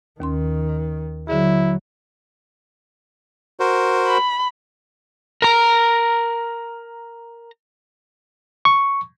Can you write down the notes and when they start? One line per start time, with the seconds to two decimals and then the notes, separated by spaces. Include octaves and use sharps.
0.20 D#2 D#3 C#4 C6
1.28 D3 F#3 E4 G#4
3.60 F#4 A#4 C5
4.07 B5
5.42 A#4 A#5
8.65 C#6